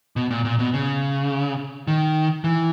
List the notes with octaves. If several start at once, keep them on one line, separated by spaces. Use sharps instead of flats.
B2
A#2
A#2
B2
C#3
D#3
E3